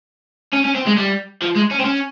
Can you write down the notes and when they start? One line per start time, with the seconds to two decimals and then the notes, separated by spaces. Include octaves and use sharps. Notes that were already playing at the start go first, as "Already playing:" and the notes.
0.53 C#4
0.64 C#4
0.75 C4
0.86 G#3
0.97 G3
1.42 F3
1.55 G#3
1.71 C#4
1.79 C4
1.85 C#4